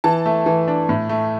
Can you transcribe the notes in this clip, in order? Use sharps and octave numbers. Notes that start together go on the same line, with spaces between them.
E3 A5
A3
E3
D4
A2
A3